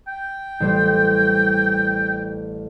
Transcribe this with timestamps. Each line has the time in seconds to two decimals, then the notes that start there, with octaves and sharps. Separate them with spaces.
0.07 G5
0.60 A1 G3 C5